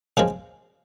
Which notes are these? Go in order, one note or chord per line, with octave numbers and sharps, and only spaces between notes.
C#3 F3 G#3